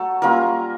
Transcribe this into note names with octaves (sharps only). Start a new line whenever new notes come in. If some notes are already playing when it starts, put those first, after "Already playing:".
Already playing: F#3 A3 A4
G3 A#3 C#4 F4 A#4